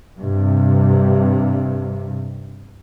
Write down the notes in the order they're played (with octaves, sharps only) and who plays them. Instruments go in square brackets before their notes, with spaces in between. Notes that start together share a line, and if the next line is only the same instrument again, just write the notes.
[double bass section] G2 C3